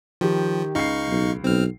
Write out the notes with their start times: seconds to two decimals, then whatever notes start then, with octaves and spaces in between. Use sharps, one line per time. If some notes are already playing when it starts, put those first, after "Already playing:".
0.21 D#3 F3 G4
0.75 C#2 D#4 F5 C#6 C7
1.09 B1
1.44 B1 C4 F6